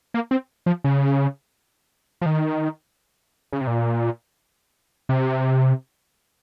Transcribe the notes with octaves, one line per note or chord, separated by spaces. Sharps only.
A#3
C4
F3
C#3
F3
D#3
C#3
C3
A#2
C3